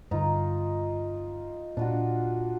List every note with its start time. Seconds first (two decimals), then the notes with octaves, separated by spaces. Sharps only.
0.11 G2 D3 D#4 F4
1.77 A#2 D4 F4 F#4